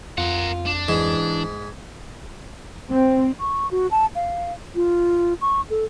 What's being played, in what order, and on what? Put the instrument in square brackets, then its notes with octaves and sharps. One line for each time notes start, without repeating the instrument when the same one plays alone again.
[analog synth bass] F2 [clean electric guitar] F4 [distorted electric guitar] A#4 F#5
[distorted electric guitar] D4
[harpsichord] G#2 [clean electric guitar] E3
[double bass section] C4
[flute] C#6
F#4
A5
F5
F4
C#6
A4